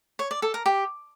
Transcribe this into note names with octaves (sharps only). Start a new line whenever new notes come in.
C#5
D5
A4
A#4
G4